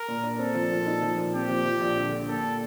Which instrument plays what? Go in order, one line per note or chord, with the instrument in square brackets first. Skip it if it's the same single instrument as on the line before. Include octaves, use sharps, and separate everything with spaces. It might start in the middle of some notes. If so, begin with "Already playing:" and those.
Already playing: [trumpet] A#4
[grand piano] A#2
D4
[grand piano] C4 [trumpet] A4
[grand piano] F3
A#2
D#4
F3
A#2
[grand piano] C4 [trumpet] G4
[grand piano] F3
F3
A#1
D3
D3
[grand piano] A#2 [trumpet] A4